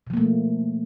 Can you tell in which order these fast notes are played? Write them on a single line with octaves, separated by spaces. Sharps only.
B2 F3 A#3 A3